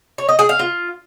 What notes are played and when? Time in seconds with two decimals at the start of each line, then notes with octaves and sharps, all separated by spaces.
0.18 C#5
0.29 D#5
0.39 G#4
0.49 F5
0.59 F4